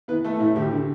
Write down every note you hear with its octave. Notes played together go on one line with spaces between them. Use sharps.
E3 B3 B4
A3 A4
A2 E4
D2 G4
D3